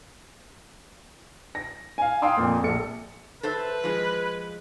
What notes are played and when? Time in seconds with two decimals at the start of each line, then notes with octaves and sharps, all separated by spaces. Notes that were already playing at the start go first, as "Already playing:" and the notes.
1.55 A#6
1.98 F5 G#5
2.22 F5 G5 G#5 C6 D#6 E6
2.37 F2 A#2
2.63 A#1 A4 C#7
3.43 A4 B4 C5 E5
3.84 F3 G#3